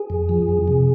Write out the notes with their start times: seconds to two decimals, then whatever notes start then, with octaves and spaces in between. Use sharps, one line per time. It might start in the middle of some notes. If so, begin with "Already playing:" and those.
Already playing: G#4
0.10 F2
0.29 F3
0.48 F2
0.68 C3